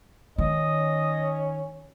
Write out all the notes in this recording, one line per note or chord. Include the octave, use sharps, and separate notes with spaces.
D#3 C#4 D#5